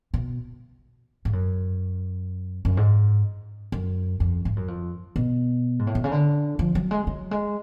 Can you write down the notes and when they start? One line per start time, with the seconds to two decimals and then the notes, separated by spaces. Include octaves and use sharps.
0.14 B2
1.25 G#2
1.33 F#2
2.65 F#2
2.77 G#2
3.72 F#2
4.20 F2
4.45 G#2
4.56 F#2
4.68 F2
5.16 B2
5.79 G#2
5.87 A2
5.95 B2
6.04 C#3
6.12 D3
6.59 F3
6.75 F#3
6.91 G#3
7.07 F#3
7.31 G#3